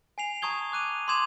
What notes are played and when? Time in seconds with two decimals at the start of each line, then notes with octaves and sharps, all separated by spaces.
0.18 G#5 C7 F7
0.42 A5 A#5 C#6 D#6 G#6 G7
0.72 D6 F#6 D#7 F7
1.08 C6 D6 D#6 G#6 E7 F7